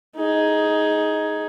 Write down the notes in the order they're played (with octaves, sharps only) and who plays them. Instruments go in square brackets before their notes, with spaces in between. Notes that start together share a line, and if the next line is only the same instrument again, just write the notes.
[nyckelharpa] D#4 G#4